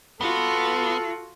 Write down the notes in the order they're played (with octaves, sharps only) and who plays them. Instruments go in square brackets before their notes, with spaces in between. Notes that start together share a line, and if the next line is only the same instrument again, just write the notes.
[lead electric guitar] B3 [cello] F4 F#4 [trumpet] A4